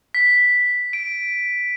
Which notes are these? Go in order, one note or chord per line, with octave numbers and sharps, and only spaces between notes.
B6
D7